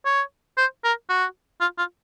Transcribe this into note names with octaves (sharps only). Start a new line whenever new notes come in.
C#5
C5
A#4
F#4
F4
F4